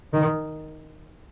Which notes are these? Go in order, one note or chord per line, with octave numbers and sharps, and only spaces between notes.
D#3